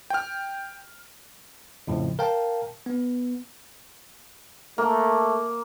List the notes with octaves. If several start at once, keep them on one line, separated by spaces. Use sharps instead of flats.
G5 F6
F2 A2 C#3 F3
A#4 F5 G5 A5
B3
A3 A#3